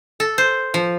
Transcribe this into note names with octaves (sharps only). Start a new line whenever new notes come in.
A4
C5
F3